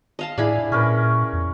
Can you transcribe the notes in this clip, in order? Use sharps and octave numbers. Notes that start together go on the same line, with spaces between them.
D#5 F5 A5
A2 D4 E4 G#4 B5
A#2 C#4 A#4 B4
E2